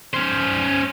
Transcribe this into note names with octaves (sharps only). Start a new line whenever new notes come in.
C#4 C5